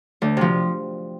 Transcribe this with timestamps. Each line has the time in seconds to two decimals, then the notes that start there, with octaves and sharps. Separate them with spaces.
0.22 D2
0.37 C3 F3